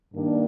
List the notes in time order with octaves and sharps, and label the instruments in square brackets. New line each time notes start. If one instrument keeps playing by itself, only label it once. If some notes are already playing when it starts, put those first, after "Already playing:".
[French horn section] G2 D#3 A#3 D4